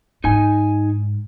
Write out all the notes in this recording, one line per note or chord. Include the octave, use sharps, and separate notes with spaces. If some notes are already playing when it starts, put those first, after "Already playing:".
G#2 D#4 G#5